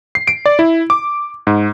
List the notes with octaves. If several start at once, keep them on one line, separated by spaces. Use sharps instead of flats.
C7
D7
D5
E4
D6
G#2